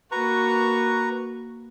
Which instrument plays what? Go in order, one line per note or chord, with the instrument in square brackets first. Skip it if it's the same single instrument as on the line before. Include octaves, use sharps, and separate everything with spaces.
[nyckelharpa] A#3 F#4 [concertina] B4 A#5 C#6